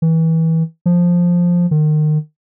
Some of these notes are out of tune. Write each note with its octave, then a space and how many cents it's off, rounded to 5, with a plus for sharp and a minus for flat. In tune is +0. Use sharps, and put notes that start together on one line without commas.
E3 -25
F3 +5
D#3 -30